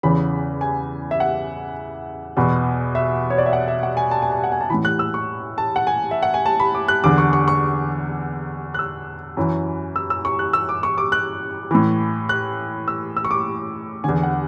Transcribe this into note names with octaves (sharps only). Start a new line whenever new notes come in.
E2 C#3 E3 B5
G#5
E5
F#5
E2 B2
E5
C#5
D5
E5
F#5
E5
F#5
G#5
A5
G#5
A5
F#5
G#5
A5
A2 E3 B5
F#6
E6
C#6
A5
F#5
G#5
E5
F#5
G#5
A5
B5
D6
F#6
E2 D3 D6
C#6
C#6
C#6
F#6
E6
F#2 E3
E6
E6
C#6
F#6
E6
D6
C#6
D6
F#6
A2 E3
F#6
E6
E6
C#6
D6
E2 D3 G#5
F#5